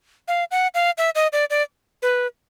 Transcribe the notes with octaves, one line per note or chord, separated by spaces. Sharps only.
F5
F#5
F5
E5
D#5
D5
D5
B4